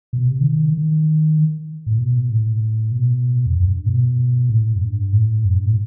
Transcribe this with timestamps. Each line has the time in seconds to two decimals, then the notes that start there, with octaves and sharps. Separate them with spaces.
0.13 B2
0.27 C3
0.41 D#3
0.73 D#3
1.86 A2
1.98 B2
2.30 A2
2.92 B2
3.46 E2
3.55 F#2
3.71 G2
3.86 B2
4.49 A2
4.76 F#2
4.81 G2
5.12 A2
5.45 F#2
5.55 G2
5.65 A2